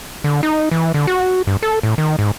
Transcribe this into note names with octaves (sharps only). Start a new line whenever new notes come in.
D3
D#4
E3
D3
F#4
G2
A4
A2
D#3
G#2